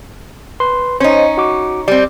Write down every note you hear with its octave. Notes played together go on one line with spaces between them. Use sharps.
B4 C6
C#4 D#4 C5 C#5
F#4 D6
G3 C4 D5